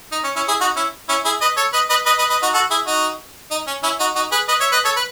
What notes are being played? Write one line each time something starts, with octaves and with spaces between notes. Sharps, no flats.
D#4
C#4
C#4 E4
E4 G#4
D#4 F#4
C#4 E4
C#4 E4
E4 G#4
B4 D#5
A4 C#5
B4 D#5
B4 D#5
B4 D#5
B4 D#5
B4 D#5
D#4 F#4
F#4 A4
E4 G#4
D#4 F#4
D#4
C#4
C#4 E4
D#4 F#4
D#4 F#4
G#4 B4
B4 D#5
C#5 E5
B4 D#5
A4 C#5
B4